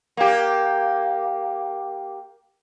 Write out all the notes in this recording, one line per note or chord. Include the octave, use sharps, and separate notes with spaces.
A#3 G4